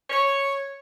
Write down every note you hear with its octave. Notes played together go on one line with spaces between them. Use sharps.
C#5